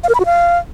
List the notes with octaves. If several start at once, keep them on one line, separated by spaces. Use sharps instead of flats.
F5
A#4
B5
F#4
F5